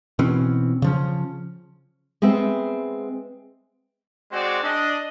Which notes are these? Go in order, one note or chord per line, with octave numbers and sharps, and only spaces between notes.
B2 E3 C4 C#4
C#3 F3 C#4
G#3 B3 C4 E5
G#3 C4 F#4 D5
D4 D#5